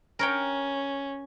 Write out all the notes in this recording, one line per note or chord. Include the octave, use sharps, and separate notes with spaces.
C#4 A#4 C#5 G5